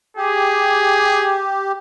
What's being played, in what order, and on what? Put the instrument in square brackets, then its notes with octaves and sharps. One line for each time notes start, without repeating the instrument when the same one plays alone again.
[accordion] G4 [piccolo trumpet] G#4